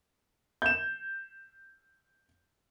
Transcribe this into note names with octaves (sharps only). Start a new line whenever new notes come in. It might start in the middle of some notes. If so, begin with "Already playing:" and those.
G6 E7